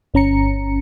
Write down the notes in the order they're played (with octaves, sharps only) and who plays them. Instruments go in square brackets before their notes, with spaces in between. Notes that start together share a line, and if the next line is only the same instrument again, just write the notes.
[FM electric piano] G1 C#4 A#5 C#7